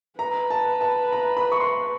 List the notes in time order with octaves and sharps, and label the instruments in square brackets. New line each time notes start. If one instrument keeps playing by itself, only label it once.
[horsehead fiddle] B4 [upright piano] A#5
[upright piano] A5
A5
A#5
B5
C#6
C6